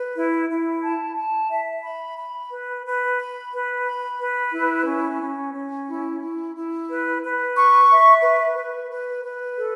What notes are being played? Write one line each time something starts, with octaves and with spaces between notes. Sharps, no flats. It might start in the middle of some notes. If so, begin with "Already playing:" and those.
Already playing: B4
E4
E4
A5
A5
E5
B5
B5
B4
B4
B5
B4
B5
B4
E4
C#4
C#4
C#4
E4
E4
E4
B4
B4
C#6
E5
B4
B4
B4
B4
A4